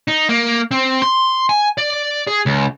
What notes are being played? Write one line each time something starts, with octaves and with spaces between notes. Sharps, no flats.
D#4
A#3
C4
C6
G#5
D5
G#4
C#2